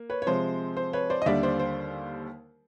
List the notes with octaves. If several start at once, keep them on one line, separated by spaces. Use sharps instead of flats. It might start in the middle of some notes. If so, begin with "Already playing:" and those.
Already playing: A#3
B4 C#5
C#5
C3 F3 G#3 C5
C5
B4 C#5
C5 D5
D#5
D#2 D3 G3 D5 E5
C5 D5
C5